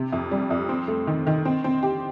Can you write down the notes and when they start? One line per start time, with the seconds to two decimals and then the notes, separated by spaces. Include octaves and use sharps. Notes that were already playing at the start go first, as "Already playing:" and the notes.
Already playing: C3
0.12 F2
0.31 G3
0.50 F2
0.69 C4
0.88 A3
1.07 D#3
1.27 D#3
1.45 C4
1.64 C4
1.83 G4